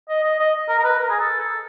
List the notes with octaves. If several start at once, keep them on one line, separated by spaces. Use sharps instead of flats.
D#5
D#5
D#5
A#4
A#4
B4
A#4
G#4
A4
A4